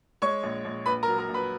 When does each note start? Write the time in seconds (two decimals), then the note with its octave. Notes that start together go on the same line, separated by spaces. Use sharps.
0.22 G#3 C#5 C#6
0.43 A#1
0.65 A#1
0.86 A#1 B4 B5
1.03 A#4 A#5
1.08 F#3
1.18 A#4 A#5
1.29 A#1
1.34 B4 B5